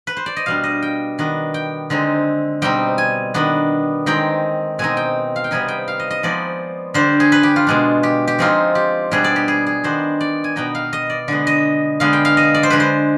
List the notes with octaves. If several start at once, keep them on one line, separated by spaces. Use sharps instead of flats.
B4
C5
D5
D#5
B2 G3 D4 F5
D#5
G5
D#3 B3 D4
G5
D3 G#3 C4 D#4
B2 G3 C4 D#4 G5
G#5
D#3 B3 D4
D#3 G#3 C4 D#4 G5
B2 G#3 C4 D#4 G#5
G5
F5
G5
C3 G3 B3 D#4 G#5
G5
F5
D#5
D#5
F3 G#3 B3 D#4 D5
D3 G3 D4 C5
G#4
B4
G4
F4
B2 G#3 D4
G4
G4
F3 G#3 C4 D#4 F4
G4
B2 G3 B3 D4 G#4
D5
G4
G#4
G#4
D#3 B3 D4 C5
D5
G#5
B2 B3 D#4 G5
F5
D#5
D5
D3 G#3 B3
D#5
D3 G#3 B3 F5
G5
F5
D#5
D5
C5
D3 G#3 D4 B4
C5